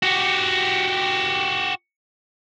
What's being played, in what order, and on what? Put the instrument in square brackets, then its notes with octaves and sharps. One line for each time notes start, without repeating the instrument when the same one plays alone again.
[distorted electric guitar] F#4 G4